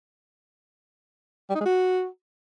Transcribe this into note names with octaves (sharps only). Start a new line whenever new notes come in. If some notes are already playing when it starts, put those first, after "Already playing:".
G3
D#4
G#3
F#4